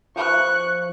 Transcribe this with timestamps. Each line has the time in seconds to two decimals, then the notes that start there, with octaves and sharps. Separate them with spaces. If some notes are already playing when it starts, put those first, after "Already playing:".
0.16 F3 C#6 F#6